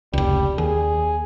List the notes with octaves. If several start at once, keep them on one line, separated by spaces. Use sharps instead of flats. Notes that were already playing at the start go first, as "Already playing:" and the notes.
F1 C#2 G3
D#2 G#4